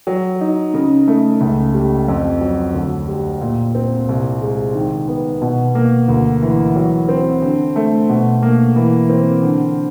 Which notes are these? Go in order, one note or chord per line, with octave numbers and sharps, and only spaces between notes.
F#3
D#4
C#3
A3
C#2
G3
F2
F#3
D2
G3
A#2
C4
C2
G#3
D#3
B3
B2
A#3
D2
E3
F#3
C4
D3
A3
B2
A#3
E3
C4
D3